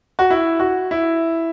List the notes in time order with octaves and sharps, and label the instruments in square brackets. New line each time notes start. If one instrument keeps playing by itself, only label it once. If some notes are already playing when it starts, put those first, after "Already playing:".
[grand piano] F#4
E4
F#4
E4